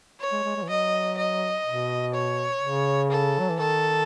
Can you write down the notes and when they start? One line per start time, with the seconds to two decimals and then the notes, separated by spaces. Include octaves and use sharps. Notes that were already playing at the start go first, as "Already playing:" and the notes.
0.20 C#5
0.32 G#3
0.44 G#3
0.56 G#3
0.63 E3
0.69 F#3 D#5
1.17 D#5
1.66 B2
2.14 C#5
2.62 C#3
3.11 A4
3.39 F#3
3.50 E3
3.59 D#3 A4